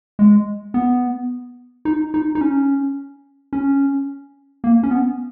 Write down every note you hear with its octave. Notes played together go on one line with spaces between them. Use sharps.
G#3
B3
D#4
D#4
D#4
C#4
C#4
A#3
C#4
B3